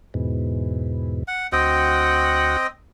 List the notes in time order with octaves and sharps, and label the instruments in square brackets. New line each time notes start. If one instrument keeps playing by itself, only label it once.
[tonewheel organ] E2 G#2 B2
[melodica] F#5
[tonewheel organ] D2 F#4 F#5 [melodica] C4 D#5 G5